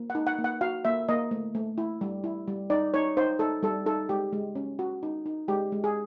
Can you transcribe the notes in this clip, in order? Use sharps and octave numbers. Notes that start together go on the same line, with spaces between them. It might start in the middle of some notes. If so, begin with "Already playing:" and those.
Already playing: A#3
F#5
D#4
F#5
A#3
F#5
F#4 F5
A#3 E5
A#3 D#5
A3
A3
E4
G3
E4
G3
D#4 D5
D#4 C#5
D#4 C5
D#4 A4
G3 A4
D#4 A4
G#3 G4
G#3
C#4
F#4
D#4
D#4
G#3 G4
G#3
G#4